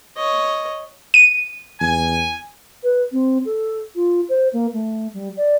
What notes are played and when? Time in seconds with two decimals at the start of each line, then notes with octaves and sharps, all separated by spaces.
0.16 C#5 D#5
1.14 D#7
1.80 E2 G#5
2.83 B4
3.12 C4
3.45 A4
3.95 F4
4.29 C5
4.53 A#3
4.73 A3
5.14 G3
5.37 D5